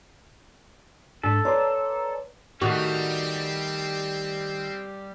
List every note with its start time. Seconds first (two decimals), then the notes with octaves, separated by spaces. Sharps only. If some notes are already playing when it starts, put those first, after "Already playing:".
1.23 G#2 D4 A4 B6
1.45 B4 C#5 D5 A#5 C6
2.61 D#3 G3 A3 C4 F#4